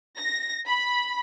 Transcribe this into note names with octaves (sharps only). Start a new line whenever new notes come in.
A#6
B5